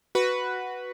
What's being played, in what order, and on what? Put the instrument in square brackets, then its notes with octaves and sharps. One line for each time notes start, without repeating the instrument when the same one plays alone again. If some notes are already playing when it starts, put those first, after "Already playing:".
[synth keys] F#4 B4